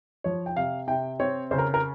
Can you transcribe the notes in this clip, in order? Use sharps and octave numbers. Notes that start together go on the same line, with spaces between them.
F3 C#5
G5
C3 F5
C3 G5
C4 C#5
C#3 C5
A#4
A#4